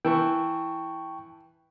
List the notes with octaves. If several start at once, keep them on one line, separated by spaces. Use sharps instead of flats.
E3 G5 A5 C#6